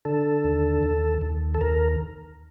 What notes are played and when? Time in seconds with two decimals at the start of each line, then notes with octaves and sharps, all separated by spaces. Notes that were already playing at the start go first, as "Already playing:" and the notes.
0.05 D3 A4
0.44 D#2
0.83 D#2
1.21 D#2
1.54 A4
1.61 D#2 A#4